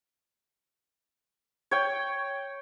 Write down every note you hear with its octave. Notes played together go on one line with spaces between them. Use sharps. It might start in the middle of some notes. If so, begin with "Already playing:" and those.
C#5 G5